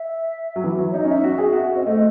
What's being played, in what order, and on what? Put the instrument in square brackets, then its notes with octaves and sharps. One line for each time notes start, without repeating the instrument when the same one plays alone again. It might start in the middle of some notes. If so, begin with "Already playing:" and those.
Already playing: [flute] E5
[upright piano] F#3
E3
F#3
[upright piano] D#4 [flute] C#5
[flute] D#5
[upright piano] C#4
[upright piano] D#4 [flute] E5
[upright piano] F#4
G#4
[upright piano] F#4 [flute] F#5
[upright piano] C4 [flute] D#5
[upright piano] A3 [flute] D#5